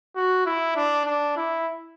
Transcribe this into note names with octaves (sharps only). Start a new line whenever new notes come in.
F#4
E4
D4
D4
E4